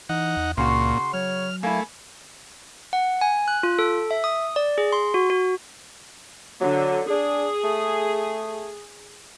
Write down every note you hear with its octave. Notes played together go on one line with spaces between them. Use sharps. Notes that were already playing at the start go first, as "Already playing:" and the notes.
E3 D#4 F#5
E2
C#2 A#2 C#3 F#4 C6
F#3 C#5 F6
A3 A#3 E4 G#5
F#5
G#5
F#6
F4
A4
E5
D#6
D5
G#4
C6
F#4
F#4
D3 F#3
D4 G#4
A3